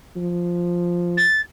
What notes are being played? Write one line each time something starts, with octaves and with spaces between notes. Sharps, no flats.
F3
A6